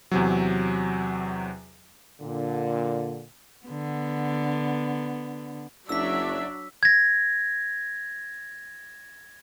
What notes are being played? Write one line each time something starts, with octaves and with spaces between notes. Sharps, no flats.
E2 C3 F#3
A#2 D3
D3 B3
F#1 F#3 D4 E5 E6 B6
G#6 A#6